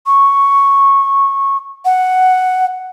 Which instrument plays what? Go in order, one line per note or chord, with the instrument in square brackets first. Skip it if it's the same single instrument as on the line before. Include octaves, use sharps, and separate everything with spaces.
[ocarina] C#6
F#5